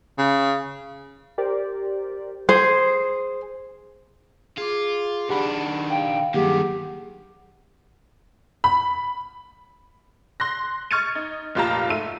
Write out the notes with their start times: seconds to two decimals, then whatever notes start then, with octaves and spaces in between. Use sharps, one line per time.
0.18 C#3
1.38 G4 A#4 C5 D5
2.49 G#4 C5
4.58 F4 G#4 D6
5.29 D#3 D4 G4 F#5 B5
5.90 F5 G5
6.34 G2 D#3 F#3 A#3 G4 G#4 F#5
8.64 B5
10.40 C6 F#6 A#6
10.91 C#6 F6 G#6 A6 C#7 D#7
11.15 D#4
11.55 F1 A#2 F4 G4 A5 A#5
11.89 G#2 A3 E5 D#7